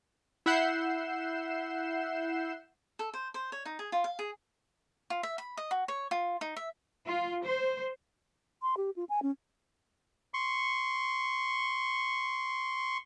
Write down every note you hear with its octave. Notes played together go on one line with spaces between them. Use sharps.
E4 E5 F#5 G6 C7 E7
A4
C5
C5
C#5
D#4
G#4
F4
F5
G#4
F4
E5
B5
D#5
F#4
C#5
F4
D#4
E5
F4
C5
C6
G4
F4
G#5
C#4
C6 C#6